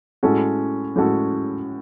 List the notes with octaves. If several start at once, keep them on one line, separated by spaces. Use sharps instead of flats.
A2 G#3 C#4 F#4 A4
A2 G#3 C#4 F#4 A4